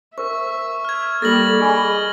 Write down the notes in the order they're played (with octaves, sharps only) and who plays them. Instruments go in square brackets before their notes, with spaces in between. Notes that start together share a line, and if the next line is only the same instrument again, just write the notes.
[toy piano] A#4 C5 [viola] E5 [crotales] C#6
[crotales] F6 G#6
[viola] G3 A#3 [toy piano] A4 [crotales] A6 A#6 F#7
[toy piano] G#4 G#5 B5 [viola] D#5